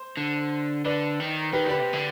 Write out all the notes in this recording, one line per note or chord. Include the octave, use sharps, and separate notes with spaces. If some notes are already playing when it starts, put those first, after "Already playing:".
Already playing: C5
D3
D3 B4 D5
D#3
D#3 G4 B4
D3 G4 B4
C3
D3